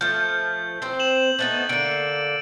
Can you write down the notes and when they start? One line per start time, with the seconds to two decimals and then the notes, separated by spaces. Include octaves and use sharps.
0.01 F3 A3 G6
0.82 C4 C5
0.99 E7 F#7
1.39 A3 B3 D#4 A6 E7
1.69 D3 A#3 D7